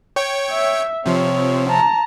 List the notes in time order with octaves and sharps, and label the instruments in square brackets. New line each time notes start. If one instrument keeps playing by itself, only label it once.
[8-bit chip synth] C#5 G5 C#6
[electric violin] E5
[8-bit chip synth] C3 F3 [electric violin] C4 C#5
[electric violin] A5 A#5